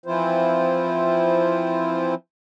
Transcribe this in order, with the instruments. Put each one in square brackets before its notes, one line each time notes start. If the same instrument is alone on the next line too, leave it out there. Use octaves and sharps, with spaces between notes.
[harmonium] E3 F3 C4 E4 F4 C5